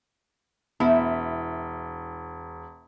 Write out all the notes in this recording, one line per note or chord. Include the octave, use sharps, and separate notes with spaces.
E1 B3 E4